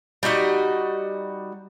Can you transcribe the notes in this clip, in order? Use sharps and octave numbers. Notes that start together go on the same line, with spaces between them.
G3 D#4 F#4 D#5